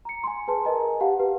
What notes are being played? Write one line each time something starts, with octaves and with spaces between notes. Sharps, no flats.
A#5 C#7
G#5 C6
G#4 B4 A5
A#4 B4 D#5 G#5 A#5
G4 F5 F#5 A5
G4 B4